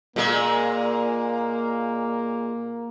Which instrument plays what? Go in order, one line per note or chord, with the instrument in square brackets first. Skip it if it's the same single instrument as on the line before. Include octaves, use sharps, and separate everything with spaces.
[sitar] A#2 G#3 [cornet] A#3